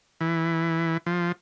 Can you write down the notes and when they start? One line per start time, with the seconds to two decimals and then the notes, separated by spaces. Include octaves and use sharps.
0.21 E3
1.06 F3